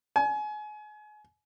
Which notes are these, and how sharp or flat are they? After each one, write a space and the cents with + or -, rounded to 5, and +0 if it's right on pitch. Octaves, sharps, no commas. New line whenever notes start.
G#5 +30